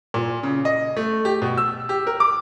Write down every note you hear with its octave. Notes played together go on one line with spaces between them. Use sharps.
A#2
C#3
D#5
A3
G4
B2
E6
G4
A#4
D6